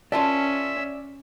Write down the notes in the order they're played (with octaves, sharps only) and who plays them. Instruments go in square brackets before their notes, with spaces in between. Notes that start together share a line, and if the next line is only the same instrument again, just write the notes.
[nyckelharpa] C#4 [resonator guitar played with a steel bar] F4 A#4 A5 [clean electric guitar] D5 [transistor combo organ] E5